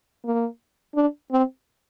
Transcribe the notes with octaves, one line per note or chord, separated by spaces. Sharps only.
A#3
D4
C4